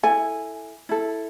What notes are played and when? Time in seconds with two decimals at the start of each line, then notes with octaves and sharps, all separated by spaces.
0.03 E4 A4 G#5
0.89 E4 A4